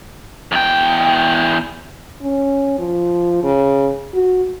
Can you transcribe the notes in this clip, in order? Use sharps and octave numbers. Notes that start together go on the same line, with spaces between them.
E2 G5
C#4
F3
C#3
F#4